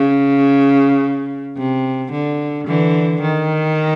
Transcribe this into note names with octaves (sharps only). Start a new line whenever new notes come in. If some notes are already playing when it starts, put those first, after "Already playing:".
Already playing: C#3
C3
D3
D3 E3
D#3